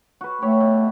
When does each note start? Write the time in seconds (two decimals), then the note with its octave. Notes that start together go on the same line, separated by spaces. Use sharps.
0.21 F#4 B4
0.41 A3 G4 C#5 E5
0.60 B2